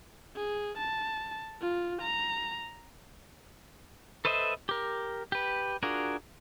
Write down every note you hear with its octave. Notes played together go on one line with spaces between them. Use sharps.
G#4
A5
F4
A#5
A4 B4 C5 D#5 E5
G4 A#4
G4 B4
D4 F4 F#4 G#4 A#4